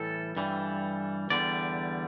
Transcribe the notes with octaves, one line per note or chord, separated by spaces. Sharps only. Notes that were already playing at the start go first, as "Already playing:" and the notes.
Already playing: A2 E3 G3 A4
G2 E3 G3
E2 D3 G3 D5